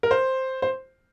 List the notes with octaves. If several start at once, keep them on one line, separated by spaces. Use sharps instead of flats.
A#4
C5
C5